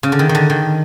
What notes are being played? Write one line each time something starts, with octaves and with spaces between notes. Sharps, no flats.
C#3
D3
D#3
D#3
D3
D#3